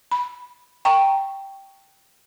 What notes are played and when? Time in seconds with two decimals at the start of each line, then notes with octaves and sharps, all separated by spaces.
0.12 B5
0.85 G5 A#5 C#6